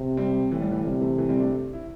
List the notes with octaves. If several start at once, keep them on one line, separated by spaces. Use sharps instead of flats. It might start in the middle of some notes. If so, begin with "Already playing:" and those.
Already playing: C3
G3 C4
A2 E3
G3
E3
C3 G3
E3 A3
E3 A3
G3 C4
A3 D4
E4